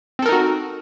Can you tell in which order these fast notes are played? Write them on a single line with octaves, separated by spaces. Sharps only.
C4 A4 A#4 D#4 F#4